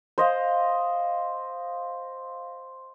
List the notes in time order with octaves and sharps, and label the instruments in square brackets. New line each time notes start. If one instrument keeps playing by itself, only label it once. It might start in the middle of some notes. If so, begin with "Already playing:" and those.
[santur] C5 D#5 F5